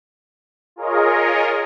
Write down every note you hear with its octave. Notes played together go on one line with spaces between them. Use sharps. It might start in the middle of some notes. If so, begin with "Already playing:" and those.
F4 G#4 A#4 C#5 D#5